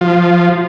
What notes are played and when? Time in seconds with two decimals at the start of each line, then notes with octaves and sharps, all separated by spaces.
0.01 F3